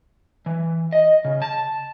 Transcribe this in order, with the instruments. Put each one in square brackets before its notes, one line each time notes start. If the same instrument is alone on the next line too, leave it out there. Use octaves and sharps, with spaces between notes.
[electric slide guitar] E3
D#5
C#3
A5